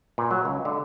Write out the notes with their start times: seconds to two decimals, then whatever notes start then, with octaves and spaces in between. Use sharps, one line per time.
0.18 A#2
0.31 F#3
0.45 C#2
0.65 D3